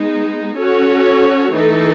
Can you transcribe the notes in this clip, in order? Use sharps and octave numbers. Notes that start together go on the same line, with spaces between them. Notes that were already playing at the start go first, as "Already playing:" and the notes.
Already playing: G#3 B3 D#4
C#4 F#4 A4 C#5
E3 A3 D#4 A4